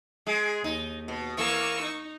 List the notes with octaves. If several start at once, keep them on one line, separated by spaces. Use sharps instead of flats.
G#3 G#4
D#2 D#4
B2
E3 A#3 A#4 C#6 E6
D#4